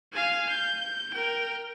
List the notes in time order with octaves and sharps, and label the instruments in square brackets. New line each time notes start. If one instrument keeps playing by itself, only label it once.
[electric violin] F5 G#5
G6
A#4 G5